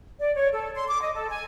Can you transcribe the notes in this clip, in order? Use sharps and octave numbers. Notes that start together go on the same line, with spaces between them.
D5
C#5
A4
C6
D6
D#5
A4
G#5